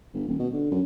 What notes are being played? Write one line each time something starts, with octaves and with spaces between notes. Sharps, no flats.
G1
D#1
B2
D3
F#2